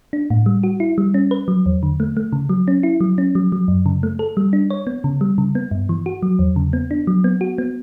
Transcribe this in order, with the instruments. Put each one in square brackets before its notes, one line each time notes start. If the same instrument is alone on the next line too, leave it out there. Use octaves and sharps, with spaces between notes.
[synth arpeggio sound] D4
A2
G3
F#4
E4
G3
C#4
B4
F#3
E2
D3
A3
A3
C#3
F#3
C#4
E4
F#3
C#4
F#3
F#3
F#2
C#3
A3
A4
G3
D4
C#5
B3
C#3
G3
C#3
B3
G2
E3
F#4
F#3
E2
C#3
B3
D4
F#3
B3
F#4
B3